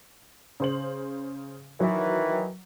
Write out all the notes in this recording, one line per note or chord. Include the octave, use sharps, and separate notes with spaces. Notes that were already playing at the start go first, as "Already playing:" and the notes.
C#3 C5 F#7
D#3 E3 F#3